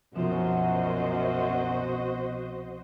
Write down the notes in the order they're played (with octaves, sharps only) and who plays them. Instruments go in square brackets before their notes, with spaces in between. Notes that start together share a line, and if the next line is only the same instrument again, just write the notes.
[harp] C2 F3 E7 [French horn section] F#2 [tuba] B2 [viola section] F#4 C5 D#5